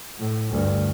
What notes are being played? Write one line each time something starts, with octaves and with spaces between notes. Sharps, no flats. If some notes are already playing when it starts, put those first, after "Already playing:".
A2
D2 G2